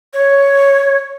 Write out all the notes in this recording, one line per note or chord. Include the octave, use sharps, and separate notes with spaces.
C#5